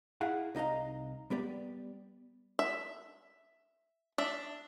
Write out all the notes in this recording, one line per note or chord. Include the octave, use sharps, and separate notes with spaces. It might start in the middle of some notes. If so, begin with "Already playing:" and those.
E4 G#4 F5 F#5
C2 D#4 D#5 F5 A#5
G3 B3 G4 D5
E5
D4 E5